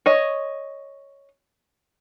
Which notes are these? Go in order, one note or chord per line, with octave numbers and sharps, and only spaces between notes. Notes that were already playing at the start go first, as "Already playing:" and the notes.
C#5 D#5